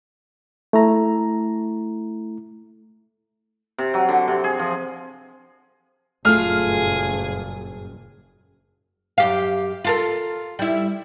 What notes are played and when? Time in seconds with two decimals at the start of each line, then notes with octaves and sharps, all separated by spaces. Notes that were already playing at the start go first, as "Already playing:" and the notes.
0.73 A3 E4 A#5
3.78 C3
3.94 F#3
4.09 D3
4.28 C3
4.44 G#4
4.59 F3
6.25 F#1 G2 A#2 A3 F4 G#4 F6
9.18 F#2 G4 F5
9.84 F4 A4 A#4
10.59 G3 E4